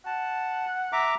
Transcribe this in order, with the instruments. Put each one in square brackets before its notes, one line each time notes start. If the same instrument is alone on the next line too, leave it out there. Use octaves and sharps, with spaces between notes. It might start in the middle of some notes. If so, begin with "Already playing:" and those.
[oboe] F#5 [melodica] A5
[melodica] E5 A#5 D6